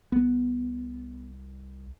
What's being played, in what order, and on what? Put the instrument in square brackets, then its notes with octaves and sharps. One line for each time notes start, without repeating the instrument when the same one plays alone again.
[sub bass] C2 [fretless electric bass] B3